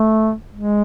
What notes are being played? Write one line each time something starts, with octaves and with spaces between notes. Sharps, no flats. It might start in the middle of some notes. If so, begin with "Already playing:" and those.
Already playing: A3
G#3